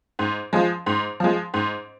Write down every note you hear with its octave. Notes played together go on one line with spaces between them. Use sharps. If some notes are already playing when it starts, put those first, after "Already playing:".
G#2
F3 G#3
G#2
F3 G#3
G#2